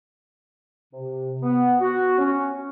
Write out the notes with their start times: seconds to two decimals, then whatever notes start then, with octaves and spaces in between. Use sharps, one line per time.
0.93 C3
1.42 B3
1.80 F#4
2.18 C#4